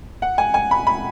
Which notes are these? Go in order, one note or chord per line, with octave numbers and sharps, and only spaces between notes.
F#5
G#5
G#5
B5
B5